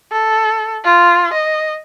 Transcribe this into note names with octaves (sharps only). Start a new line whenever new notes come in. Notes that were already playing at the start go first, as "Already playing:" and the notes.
A4
F4
D#5